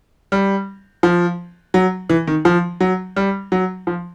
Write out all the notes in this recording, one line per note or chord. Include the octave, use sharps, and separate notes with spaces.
G3
F3
F#3
E3
D#3
F3
F#3
G3
F#3
F3